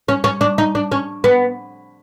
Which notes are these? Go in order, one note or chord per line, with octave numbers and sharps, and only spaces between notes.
C#4
C#4
D4
D#4
D4
C#4
B3